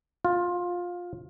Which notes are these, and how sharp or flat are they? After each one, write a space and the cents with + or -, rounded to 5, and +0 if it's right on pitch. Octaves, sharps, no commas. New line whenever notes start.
F4 +15